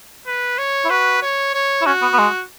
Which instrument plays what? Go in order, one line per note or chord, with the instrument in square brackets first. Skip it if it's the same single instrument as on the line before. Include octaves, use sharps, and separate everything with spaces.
[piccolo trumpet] B4
C#5
[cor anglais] E4
[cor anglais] F#4 [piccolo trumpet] B4
[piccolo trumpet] C#5
C#5
[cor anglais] E4
[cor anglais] C#4 [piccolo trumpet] F#4
[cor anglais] B3
B3
G#3